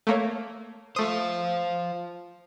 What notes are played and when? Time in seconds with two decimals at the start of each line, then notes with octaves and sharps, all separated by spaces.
0.07 A3 A#3 C#5
0.96 A3 F4 C5 D#6